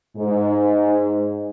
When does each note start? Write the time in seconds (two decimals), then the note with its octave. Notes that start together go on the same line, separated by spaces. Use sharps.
0.17 G#2